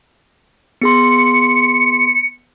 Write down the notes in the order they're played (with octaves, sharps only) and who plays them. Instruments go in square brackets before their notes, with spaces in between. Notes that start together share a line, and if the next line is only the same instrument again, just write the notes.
[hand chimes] B3 G#4 C6 [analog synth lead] C#7